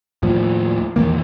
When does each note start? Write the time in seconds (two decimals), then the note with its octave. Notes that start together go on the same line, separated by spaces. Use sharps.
0.23 D#2 A2 F3
0.96 A#1 E2 D#3 A#3